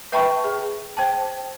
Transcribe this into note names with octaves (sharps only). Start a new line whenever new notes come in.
B4 E5 G5 A5 B5 C#6
G#4
C5 G5 A5